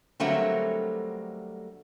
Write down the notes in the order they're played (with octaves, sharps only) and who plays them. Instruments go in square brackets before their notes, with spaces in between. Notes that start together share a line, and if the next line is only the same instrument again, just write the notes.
[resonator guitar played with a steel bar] D3 F#3 G3 A3 A#3 C4